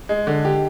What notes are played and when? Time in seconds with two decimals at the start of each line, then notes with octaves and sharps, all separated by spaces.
0.09 G#3
0.27 D3
0.45 G4